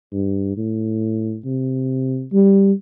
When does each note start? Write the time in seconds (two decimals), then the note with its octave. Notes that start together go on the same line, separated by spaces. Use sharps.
0.12 G2
0.57 A2
1.45 C3
2.33 G3